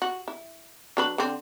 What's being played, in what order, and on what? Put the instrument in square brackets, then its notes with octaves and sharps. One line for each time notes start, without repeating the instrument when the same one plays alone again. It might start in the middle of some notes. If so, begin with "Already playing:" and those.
[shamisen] F#4
E4
F#3 D4 B4
D3 C4